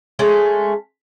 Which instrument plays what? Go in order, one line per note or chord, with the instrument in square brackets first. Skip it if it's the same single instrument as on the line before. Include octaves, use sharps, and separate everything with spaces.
[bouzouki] G#3 A3 C#4